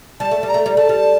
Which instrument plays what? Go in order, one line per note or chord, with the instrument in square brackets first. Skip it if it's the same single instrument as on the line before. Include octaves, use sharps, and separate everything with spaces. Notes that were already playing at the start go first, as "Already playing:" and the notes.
[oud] G3 [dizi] A5
[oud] A3
G3
[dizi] A#5
[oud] A3
G3
[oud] A3 [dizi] A5
[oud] G3